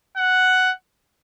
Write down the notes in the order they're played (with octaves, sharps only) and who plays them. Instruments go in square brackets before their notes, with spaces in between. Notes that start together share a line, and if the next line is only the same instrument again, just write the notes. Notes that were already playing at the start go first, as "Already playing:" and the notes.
[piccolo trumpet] F#5